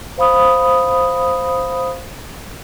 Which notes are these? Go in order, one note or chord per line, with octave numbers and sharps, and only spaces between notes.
C5 F5 B5 D#6